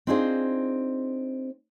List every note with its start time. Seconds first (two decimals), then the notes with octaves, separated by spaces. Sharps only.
0.07 C4 D4 D#4 F4 G#4 C5